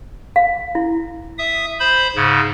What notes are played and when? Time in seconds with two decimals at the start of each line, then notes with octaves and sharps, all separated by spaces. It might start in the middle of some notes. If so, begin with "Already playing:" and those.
0.36 F5
0.75 E4
1.38 E5 D#6
1.79 C5 B5 G6
2.16 G#2 C#3